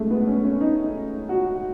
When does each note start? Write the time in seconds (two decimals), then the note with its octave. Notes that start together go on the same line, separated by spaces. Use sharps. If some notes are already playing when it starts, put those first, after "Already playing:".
Already playing: F#2 G#3 A3
0.10 B3
0.27 C#4
0.44 C#4
0.61 D#4
1.29 F#4